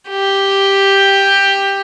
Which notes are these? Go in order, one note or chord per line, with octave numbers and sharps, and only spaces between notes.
G4